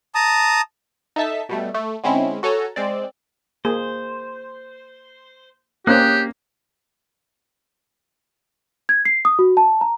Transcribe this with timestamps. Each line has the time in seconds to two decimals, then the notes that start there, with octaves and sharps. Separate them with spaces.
0.15 A5 A#5 D#6
1.16 D#4 A4 E5 A5 B6
1.49 B2 G3 A3
1.74 A3
2.04 D3 G#3 C4 C#4 E4
2.43 F#4 A4 C#5 G#5 A#5
2.76 G#3 C4 D5
3.65 A#3 G#4 C5
5.87 A#3 C4 C#4 G4 D#6 F#6
8.89 G#6
9.05 C7
9.25 D#6
9.39 F#4
9.57 A5
9.81 A#5